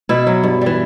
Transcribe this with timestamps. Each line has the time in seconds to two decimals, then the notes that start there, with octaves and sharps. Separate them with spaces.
0.09 B2 E4
0.27 F#3
0.44 G2
0.61 E3 G3